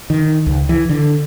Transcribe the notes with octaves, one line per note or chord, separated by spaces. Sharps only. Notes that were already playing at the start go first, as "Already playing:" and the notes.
D#3
C#2
E3
D3